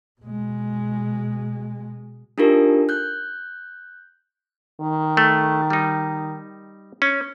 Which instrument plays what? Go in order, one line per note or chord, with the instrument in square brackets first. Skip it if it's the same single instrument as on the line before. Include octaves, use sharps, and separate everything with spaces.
[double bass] B2 G#3
[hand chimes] D4 D#4 F4 G4 A4 A#4
F#6 G6
[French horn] D#3
[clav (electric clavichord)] A3
G3 D#4
C#4